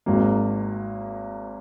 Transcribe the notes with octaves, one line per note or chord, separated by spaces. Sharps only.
G#1 G#2 F#3 A#3